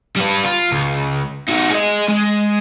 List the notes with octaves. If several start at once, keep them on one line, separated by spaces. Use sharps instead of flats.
G3 B4
F4
C#2
D#4 F#4
G#4 D#5
G#3